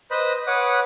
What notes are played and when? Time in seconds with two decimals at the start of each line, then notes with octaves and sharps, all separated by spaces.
0.11 B4 C5 D#5 B5
0.47 B4 C#5 F#5 D6 D#6